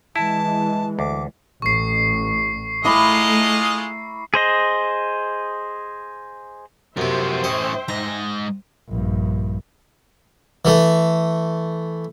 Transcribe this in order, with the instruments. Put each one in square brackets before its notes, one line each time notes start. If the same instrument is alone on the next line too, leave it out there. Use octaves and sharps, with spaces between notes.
[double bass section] E3 G#3 [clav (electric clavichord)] E4 [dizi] A5
[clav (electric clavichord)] D2 [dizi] D6
[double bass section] A1 [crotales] C#6 C7
[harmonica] G#3 F4 D#5 [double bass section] A3 [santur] E4 A#5 D6
[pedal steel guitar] G#4 C5 D#5
[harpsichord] F#2 C3 [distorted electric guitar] F3 B3 [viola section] C5 E5 G5
[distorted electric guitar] A2 C#4 [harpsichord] D#5
[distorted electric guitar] G#2 D#5 [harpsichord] A#5
[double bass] A#1 G2
[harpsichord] E3 A3